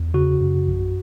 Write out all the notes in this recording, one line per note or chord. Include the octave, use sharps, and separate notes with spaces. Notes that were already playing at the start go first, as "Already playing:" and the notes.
Already playing: E2
C#3 F#4
F#2
A#1